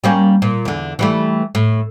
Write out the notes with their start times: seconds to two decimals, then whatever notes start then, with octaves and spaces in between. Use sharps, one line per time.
0.04 G3 A#3 C#4
0.42 A#2
0.65 E2 D3
0.99 E3 G3 A3
1.55 A2